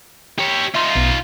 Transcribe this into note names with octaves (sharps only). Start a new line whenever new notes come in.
G4 C#5
D#4 F4 E5 C6
B1 B2